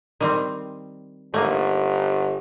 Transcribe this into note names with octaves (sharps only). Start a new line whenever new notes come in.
D#3 G3 C4
G1 A3 A#3 D#4